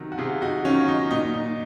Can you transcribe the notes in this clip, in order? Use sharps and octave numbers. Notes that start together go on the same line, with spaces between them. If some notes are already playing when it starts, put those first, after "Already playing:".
Already playing: C3 D#3 F#3
F#4
C3 F4 G#4
D#4 F#4
D#3 F#3 C#4 F4
D#4
A#2 D#4
D#4